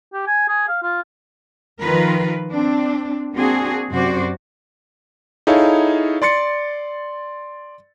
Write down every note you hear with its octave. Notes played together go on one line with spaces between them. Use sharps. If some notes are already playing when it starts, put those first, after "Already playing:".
G4
G#5
G#4
F5
F4
D#3 F3 F4 A#4 B4
C4 D4
A#3 C4 D4 F#4 G#4
F#2 C3 F#4 C5 D5
D#4 E4 G#4 A4 C#5 F5
D5 C6 A6 C#7